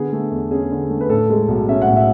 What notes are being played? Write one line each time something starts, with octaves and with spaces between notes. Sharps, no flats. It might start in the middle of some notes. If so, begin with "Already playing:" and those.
Already playing: D3 B3 G#4
A3
E2
C#4 G#4
D3
A3
B4
A2 A4
G#3
B1
C#4 E5
F#5
A2
E5